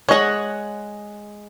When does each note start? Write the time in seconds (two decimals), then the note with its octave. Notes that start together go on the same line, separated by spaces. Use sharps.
0.09 G#3 C#5 D#5 F#5